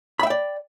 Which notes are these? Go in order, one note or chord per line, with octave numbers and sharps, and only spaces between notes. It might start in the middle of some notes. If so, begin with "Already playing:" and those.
D5 E5 G5 B5